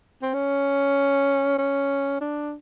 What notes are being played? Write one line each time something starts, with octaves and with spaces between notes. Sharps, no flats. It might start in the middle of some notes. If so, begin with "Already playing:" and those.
C4
C#4
C#4
D4